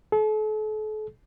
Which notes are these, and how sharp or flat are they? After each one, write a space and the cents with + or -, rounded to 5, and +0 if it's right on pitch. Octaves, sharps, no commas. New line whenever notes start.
A4 -40